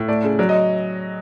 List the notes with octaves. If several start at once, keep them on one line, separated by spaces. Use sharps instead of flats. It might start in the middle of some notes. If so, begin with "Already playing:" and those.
Already playing: A2
A3 D5
C#3
F#3 D5
D#5